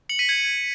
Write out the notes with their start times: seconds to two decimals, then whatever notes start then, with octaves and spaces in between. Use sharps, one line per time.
0.09 C#7 F#7
0.19 B6 D#7
0.29 G#6 C#7